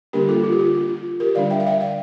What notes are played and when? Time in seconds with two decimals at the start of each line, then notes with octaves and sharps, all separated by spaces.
0.13 D3 G3 A#3 D4 G4 A#4
0.29 F4 A4
0.43 F4
0.52 G4
0.59 F4
0.74 F4
0.89 F4
1.20 G4 A#4
1.35 D3 G3 D4 D5 F5
1.51 E5 G5
1.60 F5
1.66 E5 G5
1.81 D5 F5